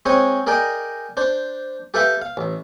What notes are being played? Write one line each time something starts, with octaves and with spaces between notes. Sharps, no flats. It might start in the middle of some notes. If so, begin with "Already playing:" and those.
G#3 C4 C#5 G#5
G#4 A#4 D5 D#5 G5
D4 C5
G4 A4 B4 E5 F5 G5
F5
A1